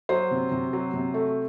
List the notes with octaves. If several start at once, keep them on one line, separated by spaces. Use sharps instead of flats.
F#3 C5
C3
C3
F#3
C3
A3